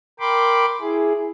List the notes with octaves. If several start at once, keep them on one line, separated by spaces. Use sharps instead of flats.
A#4 G5 B5 C6 D6
E4 G#4